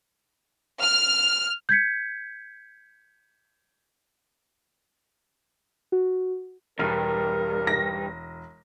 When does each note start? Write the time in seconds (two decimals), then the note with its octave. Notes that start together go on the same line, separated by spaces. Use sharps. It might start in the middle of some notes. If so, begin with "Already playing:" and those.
0.81 F6
1.69 G6 G#6 B6 C#7
5.92 F#4
6.79 E1 D2 G2 A#4 F6
7.67 A#6